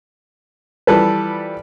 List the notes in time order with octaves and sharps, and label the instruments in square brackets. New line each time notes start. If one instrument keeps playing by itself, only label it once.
[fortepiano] E3 F3 G3 A4 B4